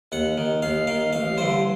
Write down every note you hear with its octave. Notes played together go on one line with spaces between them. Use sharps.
D#2 F#5
D#3
D#2 F5
D#3 F5
A1 F5
G2 D3 C5